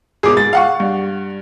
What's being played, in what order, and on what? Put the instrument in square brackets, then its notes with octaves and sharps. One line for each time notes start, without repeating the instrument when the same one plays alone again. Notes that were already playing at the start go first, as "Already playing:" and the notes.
[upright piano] G#1 B2 [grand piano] G#4 D6
[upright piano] G#2 [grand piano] A6
[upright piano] F5 F#5 C#6
G2